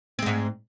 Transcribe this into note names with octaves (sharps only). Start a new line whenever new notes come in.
G#2 G#3 C4